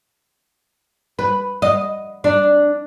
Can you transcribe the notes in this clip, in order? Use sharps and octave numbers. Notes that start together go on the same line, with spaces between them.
B4
D#5
D4